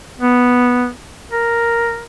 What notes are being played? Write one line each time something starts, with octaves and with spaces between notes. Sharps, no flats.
B3
A#4